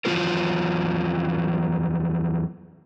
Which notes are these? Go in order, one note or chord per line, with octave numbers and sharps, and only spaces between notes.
E2 F3 F#3 G#3 F4 A#4